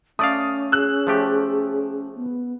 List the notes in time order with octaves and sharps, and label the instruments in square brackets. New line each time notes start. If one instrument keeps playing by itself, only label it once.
[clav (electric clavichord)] A3 D5 F5 [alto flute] C#4 [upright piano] D#6
[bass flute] G#4 [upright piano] E6 F#6
[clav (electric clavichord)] F3 A3 G4
[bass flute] B3